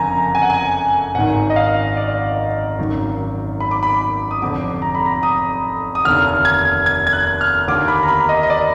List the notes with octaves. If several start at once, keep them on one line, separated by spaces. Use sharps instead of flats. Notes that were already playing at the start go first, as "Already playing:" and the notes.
Already playing: F#1 F2 D3 G#5 A#5
G#5
F#5
G#5
G#1 G#2 D#3 F#5
D#5
F5
D5
G#1 F#2 D#3
B5
D6
B5
B5
D#6
F1 F2 D3 D6
A#5
B5
A#5
D#6
D#6
F1 D#2 D3 F6
G#6
G#6
G#6
F#6
F6
D#2 D3 D6
B5
A#5
B5
D#5
D#5
D5